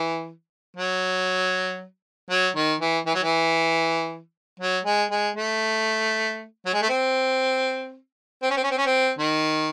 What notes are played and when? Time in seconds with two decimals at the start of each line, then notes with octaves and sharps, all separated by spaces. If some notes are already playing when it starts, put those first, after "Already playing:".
Already playing: E3
0.77 F#3
2.30 F#3
2.56 D#3
2.81 E3
3.06 E3
3.15 F#3
3.23 E3
4.60 F#3
4.85 G#3
5.11 G#3
5.36 A3
6.66 F#3
6.74 G#3
6.82 A3
6.89 C4
8.43 C4
8.50 C#4
8.57 C4
8.63 C#4
8.71 C4
8.78 C#4
8.86 C4
9.19 D#3